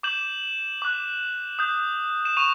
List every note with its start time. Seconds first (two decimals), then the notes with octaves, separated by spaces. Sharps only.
0.03 D6 G6 E7 F#7
0.82 D6 F#6
1.59 D#6 G6
2.25 E7
2.37 C#6 D#7 F7